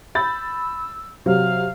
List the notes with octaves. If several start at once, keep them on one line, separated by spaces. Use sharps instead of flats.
B5 E6 G6 A6
C3 F#3 F5